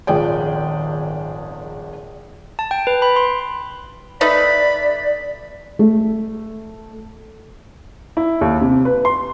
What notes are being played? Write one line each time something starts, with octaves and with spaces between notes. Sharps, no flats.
D#1 G#1 F3 G#4 D5 G5
A5
G5
B4
B5
C6
A3 D#4 B4 D5 B5
A3
E4
D#2
C3
B4
C6